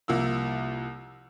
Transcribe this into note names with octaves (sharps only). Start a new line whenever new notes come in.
C2 F3 A#3 E6